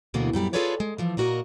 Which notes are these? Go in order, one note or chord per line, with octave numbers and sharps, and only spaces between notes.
D2 B2 D3 E3 A#3
F#2 A#2 G3 E4
F4 G#4 A4 B4 C#5 D5
G#3
E3 F3 A3
A#2 A#3 F#4 A#4 D#5